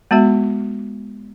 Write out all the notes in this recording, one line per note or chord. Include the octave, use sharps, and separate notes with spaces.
G#3 B3 F#4 E5